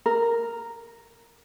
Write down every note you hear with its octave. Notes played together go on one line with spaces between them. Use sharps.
A#4